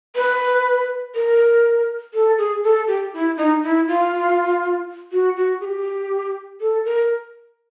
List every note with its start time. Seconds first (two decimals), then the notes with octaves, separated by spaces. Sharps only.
0.16 B4
1.15 A#4
2.14 A4
2.38 G#4
2.64 A4
2.88 G4
3.14 E4
3.37 D#4
3.63 E4
3.88 F4
5.12 F#4
5.36 F#4
5.61 G#4
5.65 G4
6.61 A4
6.85 A#4